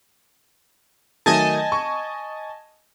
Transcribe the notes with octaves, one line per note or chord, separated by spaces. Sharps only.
D#3 F#3 A3 D#5 G#5 A5
C#6